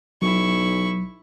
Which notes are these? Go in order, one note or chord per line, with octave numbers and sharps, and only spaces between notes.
B1 F#3 E4 C#6